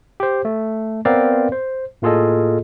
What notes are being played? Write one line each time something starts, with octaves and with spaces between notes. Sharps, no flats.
G4 C5
A3
B3 C4 A#4 B4 D5 F5
C5
A2 A#3 F4 G#4 A4 D#5